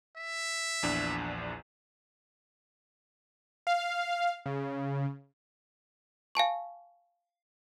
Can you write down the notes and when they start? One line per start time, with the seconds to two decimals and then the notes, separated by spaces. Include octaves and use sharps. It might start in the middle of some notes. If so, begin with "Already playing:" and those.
0.17 E5
0.83 A#1 E2 D4
3.67 F5
4.46 C#3
6.35 F5 G#5 A5 C#6